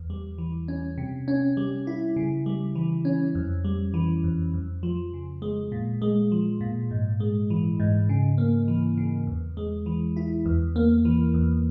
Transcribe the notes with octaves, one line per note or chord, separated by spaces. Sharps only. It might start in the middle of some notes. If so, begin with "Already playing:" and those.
Already playing: E2
G3
E3
C#4
C3
C#4
G3
E4
C#3
G3
E3
C#4
F2
G3
E3
F2
F2
F3
C#3
G#3
A#2
G#3
F3
A#2
G#2
G#3
E3
G#2
C#3
A#3
E3
C#3
E2
G#3
E3
E4
E2
A#3
E3
E2